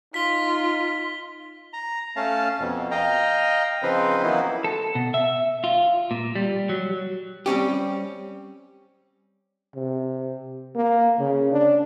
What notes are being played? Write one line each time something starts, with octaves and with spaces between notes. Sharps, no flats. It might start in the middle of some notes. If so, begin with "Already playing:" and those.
D#4 F4 B6 G7
A#5
A3 C#4 F5 A5
F2 B2
D#5 F5 G5 A#5
C#3 F3 C4 D#4 B4 C5
E3 F#3 A#3 B3 D#4 E4
A4
B2
E5
F4
A#2
G3
F#3
G3 C4 C#4 G4
C3
A#3
C#3
D4